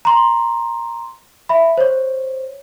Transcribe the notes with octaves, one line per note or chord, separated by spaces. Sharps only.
A#5 C6
E5 B5
C5 C#5